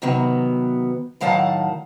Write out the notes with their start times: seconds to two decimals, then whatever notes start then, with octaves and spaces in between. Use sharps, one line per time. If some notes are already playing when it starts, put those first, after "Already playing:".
0.02 C3 D#3 F#3 B3
1.21 A2 D#3 F#3 F5 F#5 A5